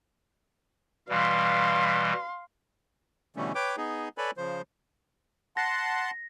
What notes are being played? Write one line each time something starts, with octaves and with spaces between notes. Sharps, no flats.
B2 E3 G3 F5 C6
B2 D3 E3 G3 A3 C#4
B4 C#5 G5 D6
B3 D#4 G#4
A4 B4 C#5 D5 G#5 B5
C#3 F3 C5
F#5 A5 C6 A#6